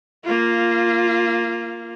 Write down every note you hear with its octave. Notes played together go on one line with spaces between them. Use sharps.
A#3 F4